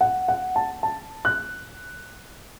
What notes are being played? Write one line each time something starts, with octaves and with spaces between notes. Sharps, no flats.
F#5
F#5
A5
A5
F#6